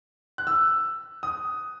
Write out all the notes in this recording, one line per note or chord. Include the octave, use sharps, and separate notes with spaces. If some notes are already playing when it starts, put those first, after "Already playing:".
F#6
E6
D#6